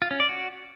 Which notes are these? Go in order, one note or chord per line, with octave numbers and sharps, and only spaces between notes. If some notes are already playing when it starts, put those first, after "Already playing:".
F4
C#4
D5
F#4